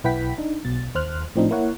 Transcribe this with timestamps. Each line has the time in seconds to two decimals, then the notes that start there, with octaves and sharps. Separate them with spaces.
0.04 B1 E4 B4 F#5 G5 B6
0.38 D4 D#4
0.65 B1 B2 A6
0.95 D#2 C5 F6 F#6
1.35 A2 F3 C4 D4 D#4
1.51 A#3 E4 A#4 C#5 F#5